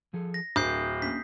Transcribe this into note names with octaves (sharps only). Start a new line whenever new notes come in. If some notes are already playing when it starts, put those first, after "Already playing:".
F3 G#4 A4
A#6
D1 A#4 C5 D#6 G6 C7
A#3 C#4 D4 B6